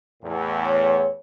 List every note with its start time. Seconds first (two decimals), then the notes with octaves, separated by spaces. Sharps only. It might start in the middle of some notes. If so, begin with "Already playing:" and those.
0.23 E2 A2
0.65 C#5